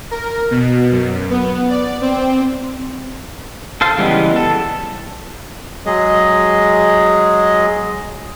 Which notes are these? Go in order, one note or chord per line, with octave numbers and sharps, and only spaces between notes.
A#4
B2
F#2
B3
D5
C4
A4 C5 F5
C#3 E3 G3 G#3 B3
A4
F#3 G#3 G#4 D#5